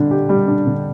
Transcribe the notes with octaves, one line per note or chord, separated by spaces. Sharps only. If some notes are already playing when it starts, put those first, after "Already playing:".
Already playing: D3 G3 D4
G4
G3
D4
D3